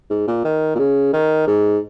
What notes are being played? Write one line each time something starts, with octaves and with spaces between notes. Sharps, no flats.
G#2
A#2
D#3
A#2
C#3
D#3
G#2